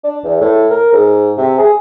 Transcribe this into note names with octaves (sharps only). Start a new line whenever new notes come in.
D4
E2
A2
A#4
G#2
C3
G#4